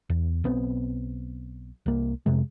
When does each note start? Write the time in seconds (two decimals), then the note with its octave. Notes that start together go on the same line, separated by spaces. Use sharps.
0.10 E2
0.44 B1 B3 C4
1.86 C2 A#3
2.26 F2 C3 G#3